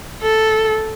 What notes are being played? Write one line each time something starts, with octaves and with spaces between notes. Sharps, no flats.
A4